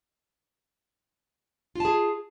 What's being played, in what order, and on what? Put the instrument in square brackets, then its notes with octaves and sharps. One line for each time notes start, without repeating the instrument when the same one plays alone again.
[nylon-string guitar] F4
A5
G#4